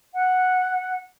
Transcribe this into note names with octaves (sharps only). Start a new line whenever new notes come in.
F#5